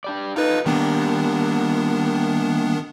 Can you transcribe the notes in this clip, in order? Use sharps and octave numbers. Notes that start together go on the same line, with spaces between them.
D4 G4 D5
D#4 F4 A4 B4 D#5
D#3 G3 A#3 B3 D4